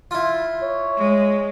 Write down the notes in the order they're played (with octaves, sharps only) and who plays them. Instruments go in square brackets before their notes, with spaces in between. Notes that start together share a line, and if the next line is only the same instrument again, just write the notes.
[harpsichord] E4 F4
[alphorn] C#5
[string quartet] G#3